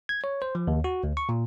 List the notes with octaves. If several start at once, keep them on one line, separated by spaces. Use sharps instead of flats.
G#6
C#5
C5
F3
D#2
F#4
D2
C#6
A#2